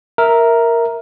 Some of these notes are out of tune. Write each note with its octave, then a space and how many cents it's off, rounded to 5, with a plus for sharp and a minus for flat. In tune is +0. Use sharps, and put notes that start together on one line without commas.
A#4 +0 E5 -10